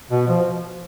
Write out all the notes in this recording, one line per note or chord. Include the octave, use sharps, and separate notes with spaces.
B2
F3